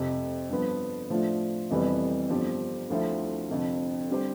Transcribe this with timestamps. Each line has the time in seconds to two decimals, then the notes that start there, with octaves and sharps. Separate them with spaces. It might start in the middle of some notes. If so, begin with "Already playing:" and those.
Already playing: F1 F2 C3
0.50 G2 F3 B3
1.10 A2 F3 A3 D4 F4
1.70 F1 F2 E3 G3 B3
2.29 G1 G2 F3 C4 G4
2.90 D2 D3 F3 A3 E4
3.50 F1 F2 D3 F3
4.10 D3 G3 C4 G4 C5